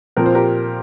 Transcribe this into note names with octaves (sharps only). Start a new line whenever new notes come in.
A#2 F3 C4 A#4
C5
G4 A#4